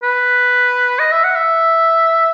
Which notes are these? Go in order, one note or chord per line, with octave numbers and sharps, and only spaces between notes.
B4
D#5
E5
F#5
E5